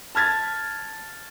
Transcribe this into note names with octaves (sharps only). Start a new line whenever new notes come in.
A5 F6 G#6 A6